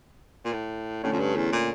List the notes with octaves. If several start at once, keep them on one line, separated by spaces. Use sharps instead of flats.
A#2
A2
A2 D3 A3 C#4
F2
G2
E2
A#2